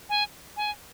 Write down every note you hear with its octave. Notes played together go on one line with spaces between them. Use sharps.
G#5
G#5